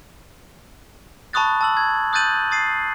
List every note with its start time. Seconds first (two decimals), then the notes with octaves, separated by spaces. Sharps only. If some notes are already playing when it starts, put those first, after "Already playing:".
1.33 A5 B5 C#6 D#6 F#6 A6
1.61 A5 E6 F#7
1.77 G#6
2.13 D#6 F#6 G6 A6 D#7 F#7
2.51 D#6 A6 C7 D#7